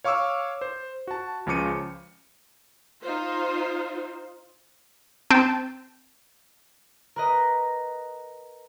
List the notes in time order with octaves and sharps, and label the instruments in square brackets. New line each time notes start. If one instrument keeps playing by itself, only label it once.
[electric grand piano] C#5 F5 C#6 D6 E6 F6
C5
F#4 A5
C#2 C#3 F3 D6 C#7 D#7
[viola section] D#4 F4 C5
[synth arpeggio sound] C4 G5 A5
[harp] A#4 B4 D#5